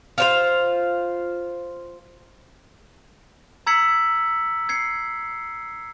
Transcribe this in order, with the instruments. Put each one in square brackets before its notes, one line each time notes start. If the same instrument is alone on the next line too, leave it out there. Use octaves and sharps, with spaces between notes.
[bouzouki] F4 C5 F5
[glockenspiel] A#5 E6 G#6 B6 C#7 F#7
G#6 C7 C#7